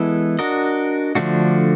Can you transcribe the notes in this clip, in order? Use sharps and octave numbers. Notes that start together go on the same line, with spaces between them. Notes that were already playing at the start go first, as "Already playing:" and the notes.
Already playing: E3 G#3 B3 E4 A4
D4 F#4 A#4 D#5
D3 F3 A3 D4 F#4